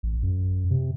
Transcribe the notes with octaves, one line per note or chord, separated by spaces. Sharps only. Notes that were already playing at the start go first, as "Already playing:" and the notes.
A1
F#2
C3